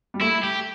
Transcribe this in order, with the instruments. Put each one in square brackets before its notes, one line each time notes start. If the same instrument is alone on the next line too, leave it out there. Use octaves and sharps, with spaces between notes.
[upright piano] G3
[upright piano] A3 [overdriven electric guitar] E4
[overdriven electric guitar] G4